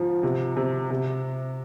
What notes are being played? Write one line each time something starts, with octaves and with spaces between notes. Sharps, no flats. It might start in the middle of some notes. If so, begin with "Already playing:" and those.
Already playing: G#2 F3
C3
C3
C3